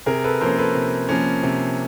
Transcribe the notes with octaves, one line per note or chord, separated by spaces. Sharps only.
C3 G#4 A#4
A4 B4
F3 A#3 C#4 A#4 C5
A4 B4
C3
F3 A#3 C#4
C3